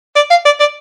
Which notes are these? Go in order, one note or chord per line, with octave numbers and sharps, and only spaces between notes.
D5
F5
D5
D5